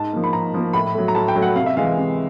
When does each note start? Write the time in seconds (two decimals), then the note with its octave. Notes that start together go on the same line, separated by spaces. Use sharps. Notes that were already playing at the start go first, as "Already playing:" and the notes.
Already playing: G#2 A5
0.13 F3 A#3
0.24 B5
0.33 G#2 A#5
0.54 F3 A#3
0.73 A2 B5
0.95 F#3 A3
1.08 A#5
1.15 A2 A5
1.28 G5
1.36 F#3 A3
1.42 F#5
1.56 C3 F5
1.66 E5
1.77 E3 G#3 F5
1.97 C3